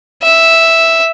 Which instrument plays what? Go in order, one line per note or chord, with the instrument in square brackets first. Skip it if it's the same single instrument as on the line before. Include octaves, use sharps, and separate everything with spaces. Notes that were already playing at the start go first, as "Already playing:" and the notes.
[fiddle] E5